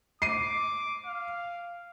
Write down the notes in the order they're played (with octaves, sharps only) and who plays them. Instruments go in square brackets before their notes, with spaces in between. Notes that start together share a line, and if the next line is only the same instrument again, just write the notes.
[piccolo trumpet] D6 [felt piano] C7 D#7
[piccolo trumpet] F5